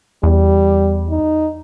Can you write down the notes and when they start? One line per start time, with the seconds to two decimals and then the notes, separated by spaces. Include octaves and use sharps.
0.23 E2 G3
1.11 D#4